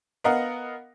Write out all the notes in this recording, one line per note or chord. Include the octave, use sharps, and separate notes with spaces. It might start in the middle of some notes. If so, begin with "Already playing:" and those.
B3 A#4 D#5 F5 F#5